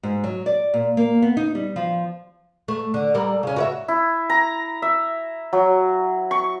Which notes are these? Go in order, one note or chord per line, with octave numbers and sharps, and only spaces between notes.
G#2
F#3
D5
A#2
A#3
B3
D#4
G3
F3
A3
D3
G3 A4 A#4
C#3 C#4
F#4 A#4 E5
E4
A#5
E5
F#3
C#6